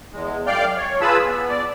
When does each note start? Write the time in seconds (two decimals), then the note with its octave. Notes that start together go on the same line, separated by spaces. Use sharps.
0.12 E2 G#3
0.47 F#2 D5 F5 G5 F6 G6
0.77 C#5
1.01 F4 G#4 B4 A5 B5 E6
1.26 B3
1.49 D5